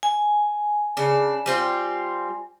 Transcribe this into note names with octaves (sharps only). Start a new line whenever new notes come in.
G#5
C#3 D4
G3 C4 F4